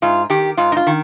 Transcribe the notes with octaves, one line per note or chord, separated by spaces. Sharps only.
G#2 F4
D#3 G4
G#2 F4
D#4
F4
D#3